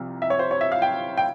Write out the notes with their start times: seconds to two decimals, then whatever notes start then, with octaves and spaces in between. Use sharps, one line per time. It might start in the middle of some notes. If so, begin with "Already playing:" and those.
Already playing: C2 C3 F3
0.22 E5
0.30 C#5
0.39 C5
0.51 C#5
0.61 E5
0.72 F5
0.82 G5
1.17 G5